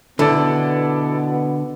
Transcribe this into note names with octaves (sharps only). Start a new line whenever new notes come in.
B2 D3 B3 E4 A4 D5